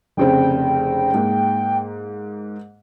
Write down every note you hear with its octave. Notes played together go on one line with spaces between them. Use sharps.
F1 C#3 C4 G5
G#2 A#3